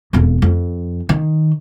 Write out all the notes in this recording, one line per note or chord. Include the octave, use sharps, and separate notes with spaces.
E1 F2
F2
D#3